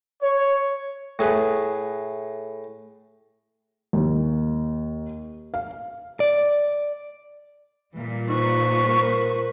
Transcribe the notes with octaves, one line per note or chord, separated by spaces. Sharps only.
C#5
A2 G#4 B4
D#2
F5
D5
A#2 E3 G3
D#4 B4 C5 C#6
A#4